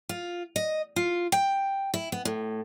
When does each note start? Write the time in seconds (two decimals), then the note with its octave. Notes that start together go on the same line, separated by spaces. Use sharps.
0.09 F4
0.56 D#5
0.96 F4
1.32 G5
1.94 E4
2.12 B3
2.25 A2